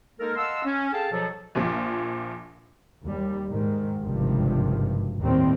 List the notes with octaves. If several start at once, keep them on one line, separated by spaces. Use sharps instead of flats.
G#3 A#3 D#4 A4 A#4
D#5 F5 F#5 A5 C6 E6
C#4
G#4 A4 F5 G5 A5
B2 F3 F#3 A4
A#1 A#2 F3
D#2 G3
G#2 D#3
G#1 C#2 G2 C3 D#3 F3
D#2 A2 D#3 G3 C4